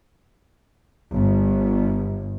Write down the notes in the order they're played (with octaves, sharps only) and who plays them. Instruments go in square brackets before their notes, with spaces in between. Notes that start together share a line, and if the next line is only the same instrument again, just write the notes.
[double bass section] G1